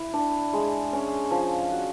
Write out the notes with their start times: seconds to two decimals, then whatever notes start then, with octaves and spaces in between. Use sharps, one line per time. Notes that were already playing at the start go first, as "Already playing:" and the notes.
Already playing: E4
0.13 D4
0.53 G#3
0.93 C#4
1.31 F3
1.71 F#4